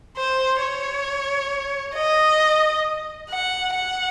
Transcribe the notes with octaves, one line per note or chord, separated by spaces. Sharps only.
C5
C#5
D#5
F#5
F#5